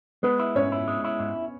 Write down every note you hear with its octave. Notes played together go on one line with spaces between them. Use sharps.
G#3 B3 B4
E4
G#2 C#4 C#5
E4
G#3
E4
G#2